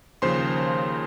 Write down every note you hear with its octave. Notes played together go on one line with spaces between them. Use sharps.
D#2 C#3 F3 C5 C6